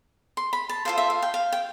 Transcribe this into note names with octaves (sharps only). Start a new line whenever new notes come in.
C6
B5
A5
F4 A4 C5 F5
E5
F5
G5
F5
G5